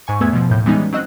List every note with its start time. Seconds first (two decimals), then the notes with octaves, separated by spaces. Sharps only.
0.07 G#2 G#5 C#6
0.20 E2 A3 B3 E6 G#6
0.33 B2 F3
0.49 D#2 A2 G6
0.66 E3 G3 G#3 B3 C#4 D#4
0.93 F#3 C4 D#5 E6 F#6